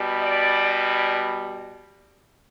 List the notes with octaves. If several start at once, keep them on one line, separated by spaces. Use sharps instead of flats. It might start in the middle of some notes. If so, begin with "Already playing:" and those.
Already playing: B2 G3
D5
D5